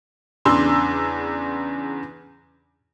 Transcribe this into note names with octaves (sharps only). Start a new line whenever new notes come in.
E2 C#3 D4 C6 E6